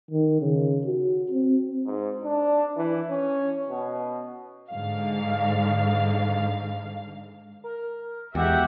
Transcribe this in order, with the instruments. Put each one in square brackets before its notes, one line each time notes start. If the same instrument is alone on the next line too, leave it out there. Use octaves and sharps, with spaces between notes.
[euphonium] D#3
C#3
F#4
C4
G#2
D4
E3
C#4
B2
[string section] G#2 D3 F5
[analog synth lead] A#4
[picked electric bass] E2 [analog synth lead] G#3 [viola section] F#4 E5 F#5 [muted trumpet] G4